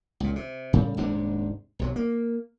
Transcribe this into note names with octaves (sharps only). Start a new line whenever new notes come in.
C#2 A#2
C3
A2 C#3 G3
D#1 G#2 C3 D4
B1 C3 F#3
A#3